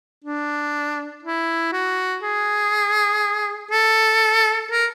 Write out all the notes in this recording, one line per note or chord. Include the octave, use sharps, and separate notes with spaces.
D4
E4
F#4
G#4
A4
A#4